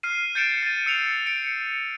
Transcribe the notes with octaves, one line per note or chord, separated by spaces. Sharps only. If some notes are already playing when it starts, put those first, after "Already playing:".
F6 C7 D#7
G6 A6 C#7 D7 E7
A6 D#7
E6 C#7 F7
C#7 D7